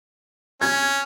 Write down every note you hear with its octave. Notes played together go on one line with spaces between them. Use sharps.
C#4 G#6